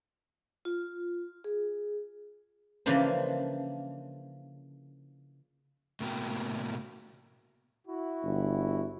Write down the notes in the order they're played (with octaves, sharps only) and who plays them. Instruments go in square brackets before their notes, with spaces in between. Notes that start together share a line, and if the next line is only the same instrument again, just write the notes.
[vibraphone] F4
G#4
[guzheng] C#3 E3 F3 A#3 D4 C5
[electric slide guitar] A2 C3 A#3 B3 F#4 G5
[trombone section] E4 F#4
[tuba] G1